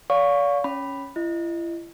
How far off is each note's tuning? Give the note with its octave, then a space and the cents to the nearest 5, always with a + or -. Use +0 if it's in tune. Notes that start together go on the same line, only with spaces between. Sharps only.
D5 -45 F5 +25 C#6 +0
C#4 +0 B5 +0
E4 +40 D#5 -10